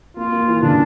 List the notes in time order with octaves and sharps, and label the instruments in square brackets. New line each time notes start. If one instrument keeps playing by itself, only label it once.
[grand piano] A#3 [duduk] F4
[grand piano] A#3
E3
[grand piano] C#3 [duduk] D4